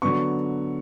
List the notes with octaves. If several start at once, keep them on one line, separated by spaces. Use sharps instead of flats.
D3 F#3 B3 C#6